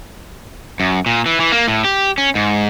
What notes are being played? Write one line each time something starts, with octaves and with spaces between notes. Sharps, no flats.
F#2
A#2
E3
E3
A#3
A2
G4
C#4
G#2